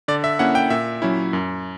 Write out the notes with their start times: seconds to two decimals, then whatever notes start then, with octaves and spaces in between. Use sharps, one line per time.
0.08 D3 D5
0.24 E5
0.39 A#3 C#4 E4 F#5
0.55 G5
0.70 A#2 E5
1.02 F#3 C#4 E4
1.33 F#2